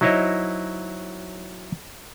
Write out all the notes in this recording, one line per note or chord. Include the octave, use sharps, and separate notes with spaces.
F#3 D#4 E4 C5 C#5 D#5